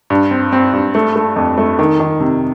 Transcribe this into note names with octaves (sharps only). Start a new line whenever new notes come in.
G2
C4
C4
G2
A3
A3
F2
A3
D#3
D#3
C3